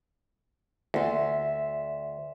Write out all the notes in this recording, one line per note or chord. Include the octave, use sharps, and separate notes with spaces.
D2 E5 C6